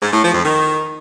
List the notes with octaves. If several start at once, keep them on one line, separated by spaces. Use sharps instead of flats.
G#2
A2
F3
F2
D#3